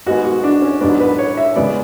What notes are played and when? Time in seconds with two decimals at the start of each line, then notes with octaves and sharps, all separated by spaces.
0.07 G#2 G#3 B3 F#4
0.24 F#4
0.43 D4
0.62 C#4
0.81 A1 G#2 F#3 B3 D4
1.00 B4
1.18 C#5
1.37 E5
1.56 C#2 C#3 G#3 B3 D5